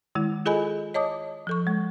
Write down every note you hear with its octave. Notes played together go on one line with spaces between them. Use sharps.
D#3 G#3 E4
F4 G#4 A4 D#5 G#5 B5
C#5 D#5 A5 D6 D#6
F3 A4 C#6
G#3